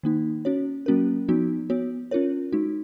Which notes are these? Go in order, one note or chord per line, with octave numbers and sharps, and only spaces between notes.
D#3 A#3 D#4
C#4 F#4 C#5
F#3 A#3 C#4 F#4 A#4
F3 B3 D#4 F#4
B3 F#4 C#5
C#4 F4 A#4 C#5
G#3 D#4 F#4